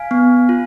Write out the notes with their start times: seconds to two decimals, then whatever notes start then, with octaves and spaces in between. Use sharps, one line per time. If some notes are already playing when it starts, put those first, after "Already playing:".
Already playing: F5 G#5
0.11 B3
0.49 F4